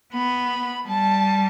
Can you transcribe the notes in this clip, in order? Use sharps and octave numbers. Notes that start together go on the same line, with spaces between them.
B3 B5
G3 A5